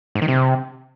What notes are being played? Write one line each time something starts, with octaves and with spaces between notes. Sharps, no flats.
G#2
D#3
C3